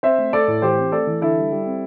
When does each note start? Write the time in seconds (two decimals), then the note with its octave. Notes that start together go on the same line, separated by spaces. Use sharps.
0.03 C4 C5 E5
0.18 A3
0.33 A3 A4 D5
0.48 A2
0.62 E3 G4 C5
0.78 C4
0.92 A3 A4 D5
1.07 E3
1.22 D3 E4 A4
1.37 G3
1.52 G3
1.66 C4